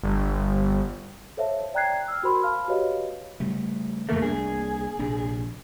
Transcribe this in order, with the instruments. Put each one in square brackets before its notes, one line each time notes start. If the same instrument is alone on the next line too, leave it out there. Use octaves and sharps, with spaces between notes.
[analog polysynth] G1
[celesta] A4 C5 C#5 E5 F5 A5
D5 G5 A#5 F#6 G#6 C7
E6 F6
F#4 A#4 C5 B5 C6
F5 A5 B5 F6
F#4 G4 B4 C#5 D#5 F5
[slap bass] C#3 G3 A3
[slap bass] F2 E3 [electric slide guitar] A3 A#3
[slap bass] C2 A#3 D4 [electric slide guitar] G#4
[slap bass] A#1 C3 D4